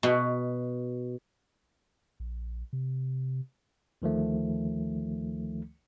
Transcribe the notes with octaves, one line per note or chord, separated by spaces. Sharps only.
B2
A#1
C3
D2 D#3 F3 A3